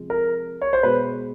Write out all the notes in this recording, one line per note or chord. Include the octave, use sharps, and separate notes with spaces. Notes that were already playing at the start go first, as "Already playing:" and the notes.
Already playing: C3 F3 G#3
A#4
C#5
C5
B2 G#3 B4